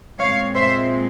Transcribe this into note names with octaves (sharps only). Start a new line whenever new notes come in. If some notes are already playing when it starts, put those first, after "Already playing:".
A#2 G#3 C4 C#5 F5
C5 E5